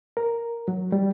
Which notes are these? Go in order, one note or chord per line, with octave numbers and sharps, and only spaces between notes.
A#4
F#3
G3